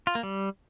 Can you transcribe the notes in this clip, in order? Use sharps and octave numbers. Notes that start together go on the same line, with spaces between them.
F4
A#3
G3